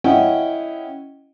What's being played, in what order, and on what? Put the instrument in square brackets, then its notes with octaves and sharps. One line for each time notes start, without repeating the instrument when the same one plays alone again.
[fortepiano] C#4 E4 D#5 F#5 G5